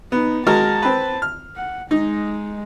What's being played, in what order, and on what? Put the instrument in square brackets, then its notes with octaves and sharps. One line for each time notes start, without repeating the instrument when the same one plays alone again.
[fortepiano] B3 [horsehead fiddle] D#4
[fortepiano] G#3 F#4 A#4 [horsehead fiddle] A5
[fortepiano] C4 B4
F6
[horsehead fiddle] F#5
[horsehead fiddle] G#3 [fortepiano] D#4